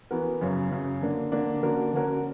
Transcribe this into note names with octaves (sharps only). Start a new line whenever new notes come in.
E3 B3 F#4 A#4
F#2 C#3 F#3
F#2 C#3 F#3
D3 A#3 D4
D3 A#3 D4
D3 A#3 C#4 F#4 A#4
D3 A#3 C#4 F#4 A#4